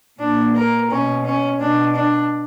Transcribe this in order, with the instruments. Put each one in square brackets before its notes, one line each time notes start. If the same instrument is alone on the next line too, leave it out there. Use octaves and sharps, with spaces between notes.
[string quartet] A#2 D4
A#4
B2 C#4
C#4
B2 D4
D4